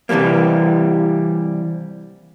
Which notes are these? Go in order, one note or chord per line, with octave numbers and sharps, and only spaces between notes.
C3 E3 F#3 G3 A#3